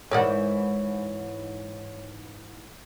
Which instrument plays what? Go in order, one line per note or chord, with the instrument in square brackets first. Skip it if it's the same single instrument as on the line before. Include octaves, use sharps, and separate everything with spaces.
[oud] G#2 E3 [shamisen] A#4 D5 F#5 [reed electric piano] C#5